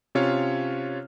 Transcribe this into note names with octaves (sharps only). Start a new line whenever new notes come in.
C3 C#4 F4 C#5 F5 F6